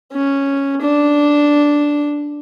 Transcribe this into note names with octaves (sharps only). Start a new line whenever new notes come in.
C#4
D4